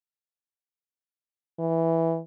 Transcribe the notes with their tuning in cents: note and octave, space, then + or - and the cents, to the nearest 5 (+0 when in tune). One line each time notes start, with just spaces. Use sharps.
E3 -5